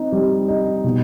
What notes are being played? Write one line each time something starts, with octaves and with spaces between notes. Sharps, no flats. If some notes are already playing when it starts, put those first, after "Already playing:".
Already playing: C4 D#4
G3
D#4
B2